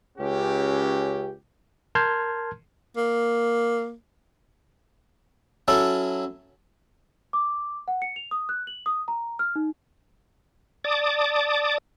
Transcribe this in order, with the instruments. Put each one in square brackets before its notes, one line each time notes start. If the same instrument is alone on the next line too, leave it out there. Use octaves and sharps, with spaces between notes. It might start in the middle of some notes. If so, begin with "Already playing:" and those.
[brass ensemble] C#2 C#4 G4
[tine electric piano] A#4 A5 C6 F6 G6 G#6
[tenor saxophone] A#3
[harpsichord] F#3 C#4 E4 A4
[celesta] D6
F#5
C#7
F7
D#6
F#6
F#7
D#6
A#5
F6
D#4
[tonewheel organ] D5 A5 D6 D#6